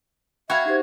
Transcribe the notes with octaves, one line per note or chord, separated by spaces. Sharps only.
F#4 E5 F5 G5 B5 G#6 C#7
D#4 G4 C5